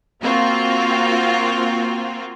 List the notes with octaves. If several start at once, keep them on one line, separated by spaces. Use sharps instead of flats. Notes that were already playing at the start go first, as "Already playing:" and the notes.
A#3 C4 F4 F#4